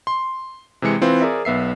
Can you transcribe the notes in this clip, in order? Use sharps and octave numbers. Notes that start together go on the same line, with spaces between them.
C6
C3 E3 G#3 C#7
E3 C4 F4 B4
G#4 A#4 D5 E5
B1 B3 E5 C7